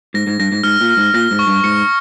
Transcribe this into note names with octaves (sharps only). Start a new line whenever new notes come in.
G#2 A#6
G#2
G2 A#6
G#2
G#2 F6
A#2
F6
G#2
A#2 A#6
G#2
C#6
G2
G#2 C#7